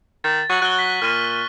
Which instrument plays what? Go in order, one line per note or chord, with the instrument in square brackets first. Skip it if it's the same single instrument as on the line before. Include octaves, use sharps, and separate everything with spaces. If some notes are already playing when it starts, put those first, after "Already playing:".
[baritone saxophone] D#3 [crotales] A6
[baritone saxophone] F#3 [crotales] C#6 F#7
[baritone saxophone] F#3 [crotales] F#6 G7
[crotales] B6
[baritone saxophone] A#2 [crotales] F6 D#7